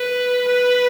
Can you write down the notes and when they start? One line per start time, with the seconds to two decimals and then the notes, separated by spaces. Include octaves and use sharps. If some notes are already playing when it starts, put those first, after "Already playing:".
Already playing: B4
0.48 B4